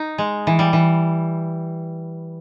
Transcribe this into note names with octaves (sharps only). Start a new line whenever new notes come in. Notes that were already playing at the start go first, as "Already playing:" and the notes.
Already playing: D#4
G#3
E3
G3
E3